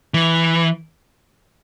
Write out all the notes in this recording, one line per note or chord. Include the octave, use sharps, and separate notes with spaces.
E3